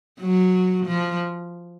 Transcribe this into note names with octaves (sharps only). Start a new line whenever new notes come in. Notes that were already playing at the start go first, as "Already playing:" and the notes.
F#3
F3